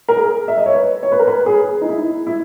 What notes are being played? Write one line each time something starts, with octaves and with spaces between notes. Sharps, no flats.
A#4
G#4
E5
D#5
C#5
B4
C#5
B4
A#4
B4
G#4
D#4
E4
E4